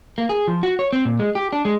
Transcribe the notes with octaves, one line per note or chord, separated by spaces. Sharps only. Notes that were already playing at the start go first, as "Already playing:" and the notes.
A#3
G#4
F3
F#4
C#5
C4
A#2
G#3
G4
D4
G#3